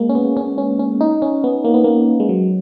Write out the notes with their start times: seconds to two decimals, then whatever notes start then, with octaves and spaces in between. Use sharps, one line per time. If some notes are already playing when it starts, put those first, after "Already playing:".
Already playing: G#3 A#3
0.09 C#4
0.15 B3
0.37 C#4
0.58 C#4
0.79 C#4
1.01 D#4
1.22 C#4
1.44 B3
1.65 A#3
1.74 B3
1.84 A#3
2.20 G#3
2.29 F#3